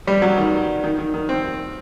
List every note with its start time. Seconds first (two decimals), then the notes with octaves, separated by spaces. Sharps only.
0.07 G3
0.22 F#3
0.38 D#3
0.84 D#3
0.99 D#3
1.14 D#3
1.29 C4